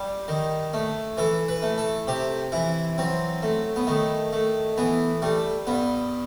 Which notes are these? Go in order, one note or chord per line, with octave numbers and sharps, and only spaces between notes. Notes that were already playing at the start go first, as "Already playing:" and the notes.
Already playing: G3 G4
D#3
A3
E3 A4
B4
A3
A4
C3 G4
E3 E4
F#3 C4
A3
B3
D#3 A3
A3
E3 B3
G3 A3
G2 B3